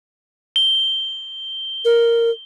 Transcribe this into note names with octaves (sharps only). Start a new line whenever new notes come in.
G7
A#4